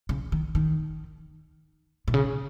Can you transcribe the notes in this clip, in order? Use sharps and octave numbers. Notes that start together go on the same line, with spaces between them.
C#3
D#3
D#3
B2
C#3